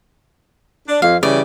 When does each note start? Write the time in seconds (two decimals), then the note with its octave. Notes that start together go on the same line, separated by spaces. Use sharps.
0.88 D4
1.02 F2 F5
1.23 C#3 E3 G3 D5